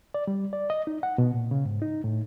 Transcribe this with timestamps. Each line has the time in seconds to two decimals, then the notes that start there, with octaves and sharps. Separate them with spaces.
0.14 D5
0.27 G3
0.53 D5
0.70 D#5
0.87 D#4
1.03 F#5
1.18 B2
1.34 A#2
1.51 C#3
1.65 G#2
1.82 D#4
2.04 A2